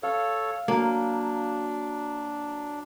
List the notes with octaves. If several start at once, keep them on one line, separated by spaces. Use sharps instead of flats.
A4 C#5 F5
F#3 A#3 D4